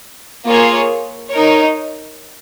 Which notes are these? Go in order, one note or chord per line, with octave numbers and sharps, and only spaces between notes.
A#3 F4 G#4 C#5
D#4 A#4 C#5